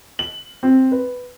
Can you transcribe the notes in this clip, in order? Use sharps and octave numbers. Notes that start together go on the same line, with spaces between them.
F#7
C4
B4